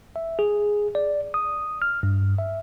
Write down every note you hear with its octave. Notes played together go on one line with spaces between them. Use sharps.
E5
G#4
D5
D#6
F6
G2
E5